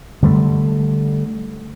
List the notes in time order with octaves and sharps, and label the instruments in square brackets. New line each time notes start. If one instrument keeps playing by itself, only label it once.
[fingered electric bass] D3 G3 A3